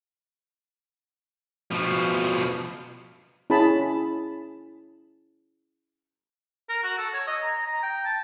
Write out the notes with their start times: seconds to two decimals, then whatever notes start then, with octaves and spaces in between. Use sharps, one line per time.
1.71 B2 F3
3.50 C#4 E4 G#4 A5 B5
6.69 A#4
6.83 F#4
6.98 A4
7.14 C#5
7.27 D#5
7.42 A#5
7.67 A#5
7.83 G5
8.05 A5